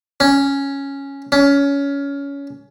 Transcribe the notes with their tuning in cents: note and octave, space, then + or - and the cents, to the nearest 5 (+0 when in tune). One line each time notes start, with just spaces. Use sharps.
C#4 +0
C#4 +20